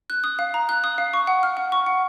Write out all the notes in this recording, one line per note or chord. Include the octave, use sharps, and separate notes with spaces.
F#6
D#6
F5
A#5
F#6
D#6
F5
C#6
F#5
F6
F#5
C#6
F#5